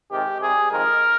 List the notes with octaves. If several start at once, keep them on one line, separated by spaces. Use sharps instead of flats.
C3 D#3 G#3 G4
C3 G3 G#4
F2 D#3 G#3 A#4